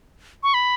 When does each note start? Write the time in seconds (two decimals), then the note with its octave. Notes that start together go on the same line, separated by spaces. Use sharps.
0.43 C#6
0.54 B5